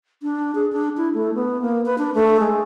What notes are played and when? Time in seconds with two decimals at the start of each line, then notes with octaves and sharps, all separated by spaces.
0.23 D4
0.55 G#4
0.73 D4
0.97 E4
1.14 A3
1.35 B3
1.62 A#3
1.86 B4
1.98 D4
2.15 A3
2.40 G#3